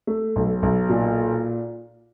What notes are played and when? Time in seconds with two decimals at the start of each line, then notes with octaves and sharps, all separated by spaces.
0.07 A3
0.36 B1
0.63 B1
0.89 A#2